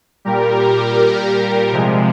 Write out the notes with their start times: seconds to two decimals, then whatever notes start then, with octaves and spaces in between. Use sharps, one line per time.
0.25 A#2 G3 G4 A#4
1.72 C3 F3 G#3